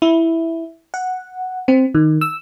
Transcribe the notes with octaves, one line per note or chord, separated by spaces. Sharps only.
E4
F#5
C4
D#3
E6